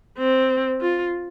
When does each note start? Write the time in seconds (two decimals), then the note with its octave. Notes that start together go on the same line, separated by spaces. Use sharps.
0.18 C4
0.81 F4